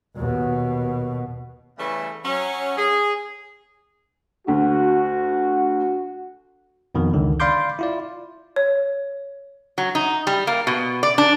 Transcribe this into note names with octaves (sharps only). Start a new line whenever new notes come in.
D#2 B2
C#3 E3 G3 A3 B3 C#4
F#3 C#4
G#4
D2 D3 F#4
F2 B2 D#3
C#2 D3 D#3
D5 F5 B5 C6 D6 G6
E4 F4 D5
C#5
F#3
D#4
G3
A#3
B2
D5
D4